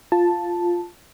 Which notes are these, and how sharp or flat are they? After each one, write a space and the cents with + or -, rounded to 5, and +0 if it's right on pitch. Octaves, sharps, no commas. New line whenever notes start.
F4 +0 A5 +0